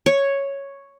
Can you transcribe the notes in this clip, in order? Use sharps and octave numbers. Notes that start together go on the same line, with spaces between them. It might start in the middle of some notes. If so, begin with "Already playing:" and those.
C#5